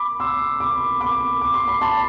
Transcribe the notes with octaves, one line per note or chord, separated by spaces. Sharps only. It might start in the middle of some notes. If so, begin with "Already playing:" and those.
Already playing: B5 D6
C6 E6
B5 D6
B5 D6
D6
C6
B5
A5 C6